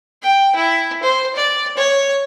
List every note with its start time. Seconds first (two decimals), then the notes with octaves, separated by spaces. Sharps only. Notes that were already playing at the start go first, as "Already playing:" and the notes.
0.23 G5
0.56 E4
1.03 C5
1.36 D5
1.77 C#5